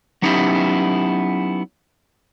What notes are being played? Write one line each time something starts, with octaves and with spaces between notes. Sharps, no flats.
F#3 B3 C#4 D#4 E4 G4